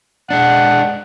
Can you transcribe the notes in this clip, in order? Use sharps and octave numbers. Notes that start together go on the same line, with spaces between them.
G#3 D4 F#5